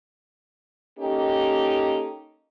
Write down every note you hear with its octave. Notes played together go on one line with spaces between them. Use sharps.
A#3 C#4 D#4 G4 A4